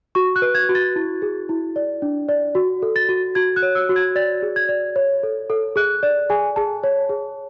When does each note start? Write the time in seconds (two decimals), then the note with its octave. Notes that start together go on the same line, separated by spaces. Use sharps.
0.15 F#4 C#6
0.36 F#6
0.42 B4
0.55 G#6
0.69 F#4
0.75 A6
0.96 E4
1.22 G#4
1.49 E4
1.76 D5
2.02 D4
2.29 D5
2.55 F#4
2.82 A4
2.96 A6
3.09 F#4
3.35 F#4 G#6
3.56 F#6
3.62 C#5
3.75 E6
3.89 F#4
3.96 G#6
4.16 D5 A6
4.42 G#4
4.56 G#6
4.69 D5
4.96 C#5
5.23 A4
5.50 A4
5.76 G#4 F#6
6.03 D5
6.30 G#4 G#5
6.56 G#4 A5
6.84 C#5
7.09 G#4